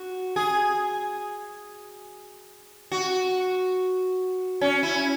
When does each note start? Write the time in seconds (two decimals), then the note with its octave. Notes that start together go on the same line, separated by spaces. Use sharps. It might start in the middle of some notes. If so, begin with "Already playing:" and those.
Already playing: F#4
0.36 G#4
2.92 F#4
4.61 C#4
4.83 E4